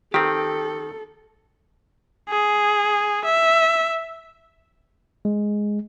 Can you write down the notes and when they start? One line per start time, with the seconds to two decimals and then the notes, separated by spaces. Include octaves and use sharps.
0.14 D#3 C4 G4 A4
2.29 G#4
3.25 E5
5.25 G#3